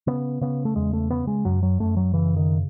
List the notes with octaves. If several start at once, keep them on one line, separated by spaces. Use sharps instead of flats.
C#3 B3
C#3 B3
A3
E2 G#3
A3
C#3 B3
G#3
F#2 F#3
F#3
F#2 A3
F#3
C#3 E3
D#3